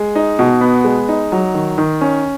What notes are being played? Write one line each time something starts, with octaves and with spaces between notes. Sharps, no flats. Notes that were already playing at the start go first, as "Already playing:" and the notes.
Already playing: G#3
D#4
B2
B3
G#3
D#4
F#3
D#3
D#3
C#4